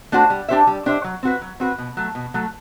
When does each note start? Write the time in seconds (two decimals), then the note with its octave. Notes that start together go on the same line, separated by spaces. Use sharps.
0.12 A3 D4 F#4 C5
0.30 G3
0.49 D4 G4 C5 E5
0.67 G3
0.86 D4 G4 C5 E5
1.04 F#3
1.23 C4 F#4 B4
1.41 F#3
1.60 C4 F#4 B4
1.78 B2
1.97 F#3 A3
2.15 B2
2.34 F#3 A3